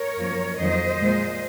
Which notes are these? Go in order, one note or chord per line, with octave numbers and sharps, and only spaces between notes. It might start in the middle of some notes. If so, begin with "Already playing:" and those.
Already playing: A#4 C#5
F#2 F3 A#3
F2 D#3 F#3 A#3 C5 D#5
A#2 G#3